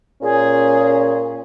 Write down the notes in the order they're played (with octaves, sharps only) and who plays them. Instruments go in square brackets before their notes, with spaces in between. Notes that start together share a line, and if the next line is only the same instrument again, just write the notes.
[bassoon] A#2 [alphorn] C#4 [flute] G#4